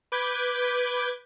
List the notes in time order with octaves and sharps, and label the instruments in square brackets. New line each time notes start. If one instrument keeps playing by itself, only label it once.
[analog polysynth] B4 D6 G6 G#6